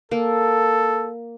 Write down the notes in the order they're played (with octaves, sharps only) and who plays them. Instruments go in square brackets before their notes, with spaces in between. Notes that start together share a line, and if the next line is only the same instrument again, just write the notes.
[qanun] A#3 [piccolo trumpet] A4